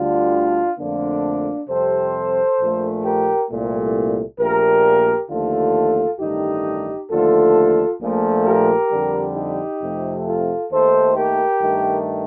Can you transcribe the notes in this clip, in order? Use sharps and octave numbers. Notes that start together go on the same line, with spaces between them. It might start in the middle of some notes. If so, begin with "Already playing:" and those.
Already playing: D2 D3 G3 D4 F4
F2 D3 F3 A3 A#3 D4
F2 C3 G3 A4 C5
A#1 A#2 F3 A3
G4 A#4
C2 A#2 A3
A#1 A#2 A3 G4 A#4
D#2 D3 F3 A3 F4 A4
A1 G2 D#3 A3 D#4 G4
D#2 D3 F3 A3 F4 A4
A#1 A#2 F3 A3
G4 A#4
F2 D3 G3
D#4 G4
F2 C3 F3 A3
F4 A4
D#2 D#3 A3 A4 C5
G4 A#4
G2 D#3 A3